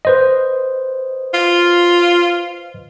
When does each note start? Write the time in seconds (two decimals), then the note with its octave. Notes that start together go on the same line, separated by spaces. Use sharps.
0.05 B4 C5 D#5
1.34 F4